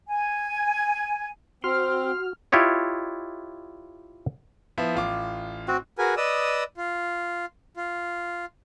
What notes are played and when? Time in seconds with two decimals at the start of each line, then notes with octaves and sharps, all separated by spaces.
0.08 G#5
1.64 C4 F#4 C6 F6
2.52 E4 F4 G4 C#5 D#5
4.78 F3 B3 E4
4.95 A1 F4 D6
5.68 C4 F#4
5.98 F#4 G#4 A#4 B4 G#5
6.17 B4 D5 D#5 D#6 E6
6.77 F4
7.77 F4